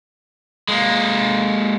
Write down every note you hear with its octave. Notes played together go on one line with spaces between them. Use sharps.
G#3 A#3